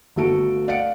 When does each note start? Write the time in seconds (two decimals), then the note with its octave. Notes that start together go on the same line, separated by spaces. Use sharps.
0.16 G1 A3 F#4 A4 D7
0.68 D5 F5 F#5 A6 C#7 D7